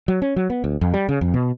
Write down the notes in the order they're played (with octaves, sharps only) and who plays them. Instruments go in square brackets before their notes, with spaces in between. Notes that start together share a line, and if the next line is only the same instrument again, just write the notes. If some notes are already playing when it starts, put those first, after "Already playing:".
[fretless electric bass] F#3
C#4
F#3
B3
D2
F2
G3
C#3
F2
B2